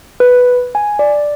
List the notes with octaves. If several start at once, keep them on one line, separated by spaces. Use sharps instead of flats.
B4
G#5
D5